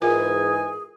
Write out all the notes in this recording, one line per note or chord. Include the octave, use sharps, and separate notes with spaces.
G#2 E3 F4 G#4 A#4 G#5